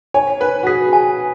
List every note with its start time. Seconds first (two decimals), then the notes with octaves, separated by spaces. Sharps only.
0.14 C#5 G#5
0.40 B4 G#5
0.63 F#4
0.67 G#4 B6
0.93 G#5